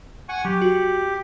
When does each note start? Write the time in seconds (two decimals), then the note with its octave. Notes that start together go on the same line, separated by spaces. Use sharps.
0.29 F#5 G#5 C#6
0.45 F#3 G4
0.62 F#4